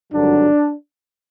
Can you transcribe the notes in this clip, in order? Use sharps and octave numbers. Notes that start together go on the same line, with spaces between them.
G#1 G2 D3 F#3 D4